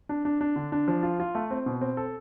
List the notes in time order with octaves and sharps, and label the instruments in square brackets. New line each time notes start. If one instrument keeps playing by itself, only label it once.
[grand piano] D4
D4
D4
D3
D4
F3
F4
F4
A3
C4
B2
C4
A4